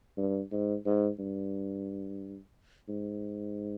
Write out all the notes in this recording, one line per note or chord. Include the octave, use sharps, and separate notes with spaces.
G2
G#2
G#2
G2
G#2